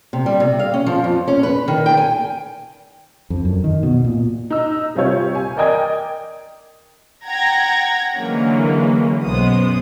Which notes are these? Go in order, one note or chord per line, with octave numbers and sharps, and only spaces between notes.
C3
G3
C3
F5
C#4
F3
F2
C#4
B4
D#3
G5
G#5
F2
F#2
D#3
B2
A#2
D#4 E6
C3 G3 F4 C#5 G6
G#5
A#4 D5 D#5 G5 D#6 G#6
F#5 G5 A#5 G#6 A#6
D3 E3 F#3 G#3 A#3 C#4
B1 F#2 G#3 B3 C5 D#6